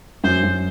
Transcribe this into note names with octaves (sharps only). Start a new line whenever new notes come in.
F#2 C5
F#2